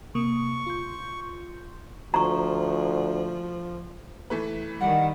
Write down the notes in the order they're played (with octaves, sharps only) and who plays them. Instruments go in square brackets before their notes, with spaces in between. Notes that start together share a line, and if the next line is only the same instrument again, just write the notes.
[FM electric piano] C3 A#3 D#6 [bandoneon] C#6
[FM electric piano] F4 C6 G6
[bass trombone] D2 [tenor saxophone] F3 [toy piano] A#5 C#6
[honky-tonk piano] E3 A3 B4
[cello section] D#3 G3 [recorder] F#5